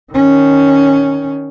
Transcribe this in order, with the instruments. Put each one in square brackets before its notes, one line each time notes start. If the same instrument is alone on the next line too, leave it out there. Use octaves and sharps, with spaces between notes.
[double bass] D#3 C#4